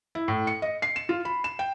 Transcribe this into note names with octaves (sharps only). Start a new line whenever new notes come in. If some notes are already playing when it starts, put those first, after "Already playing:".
E4
A2
C#7
D#5
C7
E7
F4
B5
E7
G5